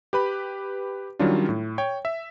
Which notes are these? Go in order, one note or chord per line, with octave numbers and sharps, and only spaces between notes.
G4 B4 B5
D#3 F#3 G3 C#4 D4 F4
A2
C#5 G5
E5